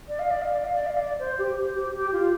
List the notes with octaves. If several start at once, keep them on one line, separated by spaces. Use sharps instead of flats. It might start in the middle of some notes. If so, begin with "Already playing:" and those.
D5
F5
D5
F5
D5
F5
D5
F5
D5
C5
G4
C5
G4
G4
F4